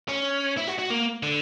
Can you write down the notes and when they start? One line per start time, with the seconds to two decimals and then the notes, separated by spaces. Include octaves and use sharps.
0.08 C#4
0.57 E4
0.68 F#4
0.79 F#4
0.90 A#3
1.23 D3